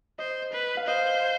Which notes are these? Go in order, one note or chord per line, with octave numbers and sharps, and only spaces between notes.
C5 D#5
B4
F5
C5 D#5